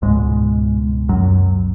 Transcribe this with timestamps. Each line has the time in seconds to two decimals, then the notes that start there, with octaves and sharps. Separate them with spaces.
0.02 C#2 G#2 B2 G#3
1.09 F#2 F#3